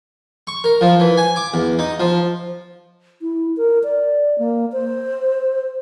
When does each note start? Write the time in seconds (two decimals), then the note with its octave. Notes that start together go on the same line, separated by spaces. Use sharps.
0.47 C#6
0.64 A#4
0.81 F3
1.00 E3
1.17 G#5
1.36 D6
1.54 E2
1.79 D#4
2.00 F3
3.22 E4
3.57 A#4
3.84 D5
4.38 A#3
4.72 C5